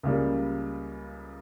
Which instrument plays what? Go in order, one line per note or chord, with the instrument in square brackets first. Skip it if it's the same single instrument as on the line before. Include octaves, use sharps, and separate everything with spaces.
[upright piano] C#2 C#3 G3 A#3